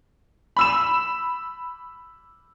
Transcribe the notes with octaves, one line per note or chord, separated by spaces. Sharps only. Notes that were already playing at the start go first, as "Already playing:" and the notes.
B5 E6 E7